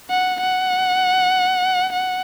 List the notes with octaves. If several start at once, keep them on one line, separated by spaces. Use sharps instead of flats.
F#5
F#5
F#5